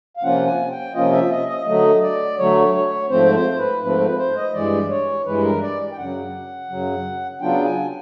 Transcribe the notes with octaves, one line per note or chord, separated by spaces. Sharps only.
F5
C3 F3 A#3 C#4 F4 F#5
G#5
G5
C3 F3 A#3 C#4 F4 D#5
E5
D#5
D#5
D3 F#3 A3 D#5
D5
D3 F#3 A3 C#5
C#5
G#2 F3 A3 C4 C5
C5
B4
G#2 F3 A3 C4 B4
B4
C5
D#5
G2 E3 G#3 D5
C#5
G2 E3 G#3 B4
A#4
D5
G5
F#2 C#3 F#3 F#5
F#2 C#3 F#3
C#3 F#3 B3 D4 F4 G5
G#5